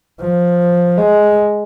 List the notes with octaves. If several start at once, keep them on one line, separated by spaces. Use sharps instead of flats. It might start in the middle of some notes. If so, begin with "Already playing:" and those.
F3
G#3